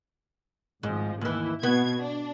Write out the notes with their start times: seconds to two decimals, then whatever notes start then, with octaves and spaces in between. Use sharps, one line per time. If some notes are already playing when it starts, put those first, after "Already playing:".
0.83 G#1 G#2 F3
1.21 D#2 E3 E4
1.63 B2 B3 G#6
2.02 D4